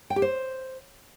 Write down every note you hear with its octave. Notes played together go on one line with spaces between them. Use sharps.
G5
G4
C5